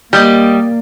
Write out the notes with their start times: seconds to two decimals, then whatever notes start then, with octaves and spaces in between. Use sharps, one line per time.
0.13 G3 A#3 D5 D#5 G6